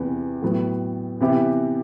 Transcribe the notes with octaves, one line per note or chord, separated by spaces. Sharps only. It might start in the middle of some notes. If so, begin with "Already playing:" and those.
Already playing: E2 C3 E3 B3
A2 F#3 B3
C3 E3 B3 E4 G4